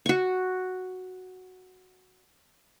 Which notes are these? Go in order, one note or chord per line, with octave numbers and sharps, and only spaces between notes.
F#4 C#6